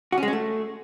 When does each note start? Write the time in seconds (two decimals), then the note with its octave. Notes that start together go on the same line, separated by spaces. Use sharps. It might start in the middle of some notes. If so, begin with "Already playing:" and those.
0.12 F#4
0.18 C#4
0.23 G#3
0.28 C#4
0.33 A3